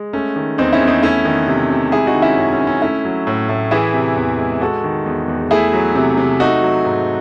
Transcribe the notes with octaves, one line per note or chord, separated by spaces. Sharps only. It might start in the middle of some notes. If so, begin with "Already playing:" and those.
Already playing: G#3
A3 C#4
D#3
E2 C4 D#4
C#4 E4
E2
C4 D#4
A3 C#4 E4
D#3
C3
C3
G#3 E4 G#4
D#4 F#4
D#3
C#4 E4
F#2
C#4
F#2
C#4
A3 C#4 E4
F#3
A2
A2
E3 E4 G#4
C3
E2
G#3
G#3 F#4 A4
D#3
E2
E2
A3 E4 G#4
F#3
C3
C3
A3 D#4 F#4
F#3
G#2